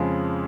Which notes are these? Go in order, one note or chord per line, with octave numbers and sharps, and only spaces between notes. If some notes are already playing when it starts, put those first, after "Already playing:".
Already playing: F2 C#3 F3 G#3